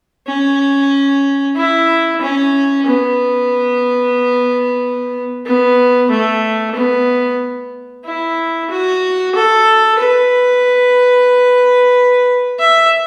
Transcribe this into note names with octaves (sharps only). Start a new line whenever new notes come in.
C#4
E4
C#4
B3
B3
A3
B3
E4
F#4
A4
B4
E5